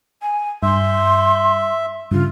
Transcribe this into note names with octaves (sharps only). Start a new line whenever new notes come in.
G#5
G2 E5 C6
G2 C#3 F4